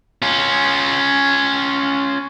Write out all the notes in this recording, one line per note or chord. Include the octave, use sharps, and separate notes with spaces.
C#4 F4